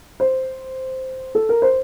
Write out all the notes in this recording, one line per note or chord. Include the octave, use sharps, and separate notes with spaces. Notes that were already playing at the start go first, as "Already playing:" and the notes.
C5
A4
A#4
C5